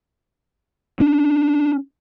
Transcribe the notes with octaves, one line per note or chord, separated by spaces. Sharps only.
C#4 D4